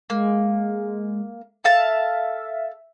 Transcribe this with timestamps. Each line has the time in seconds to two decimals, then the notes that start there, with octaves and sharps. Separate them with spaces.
0.10 G#3 A#3
1.64 A4 E5 F5 A5